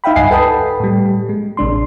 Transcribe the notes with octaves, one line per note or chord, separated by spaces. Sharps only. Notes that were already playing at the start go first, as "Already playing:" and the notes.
D#4 E5 F5 G5 B5
C#2 G2 D#5 F#5 G#5 C7
A4 B4 G5 A5 B5 D#6
A2 G3
G#3
A1 C3 D4 C6